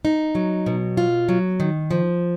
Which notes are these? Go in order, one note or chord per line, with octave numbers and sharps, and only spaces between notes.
D#4
F#3
B2
F4
F#3
D#3
F3